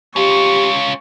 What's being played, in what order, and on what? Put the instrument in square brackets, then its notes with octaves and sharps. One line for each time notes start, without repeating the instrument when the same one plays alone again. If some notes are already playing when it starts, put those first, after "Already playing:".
[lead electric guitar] C#4 F4 [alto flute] G4 [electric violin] C#6